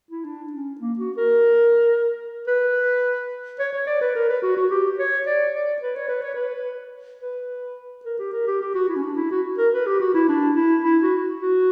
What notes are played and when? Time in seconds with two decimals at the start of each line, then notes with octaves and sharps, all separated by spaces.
0.11 E4
0.24 D4
0.53 C#4
0.81 A#3
0.99 F#4
1.17 A#4
2.47 B4
3.59 C#5
3.73 C#5
3.87 D5
4.01 B4
4.15 A#4
4.29 B4
4.43 F#4
4.57 F#4
4.70 G4
4.99 C#5
5.26 D5
5.54 D5
5.82 B4
5.95 C#5
6.08 B4
6.22 C#5
6.34 B4
7.22 B4
8.05 A#4
8.19 G4
8.33 A#4
8.47 G4
8.61 G4
8.75 F#4
8.89 E4
8.96 C#4
9.03 D4
9.16 E4
9.31 F#4
9.58 A#4
9.73 B4
9.86 G4
10.00 F#4
10.14 E4
10.28 D4
10.56 E4
10.84 E4
11.03 F#4
11.40 F#4